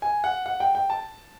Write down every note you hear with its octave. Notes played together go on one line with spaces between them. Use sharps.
G#5
F#5
F#5
G5
G5
A5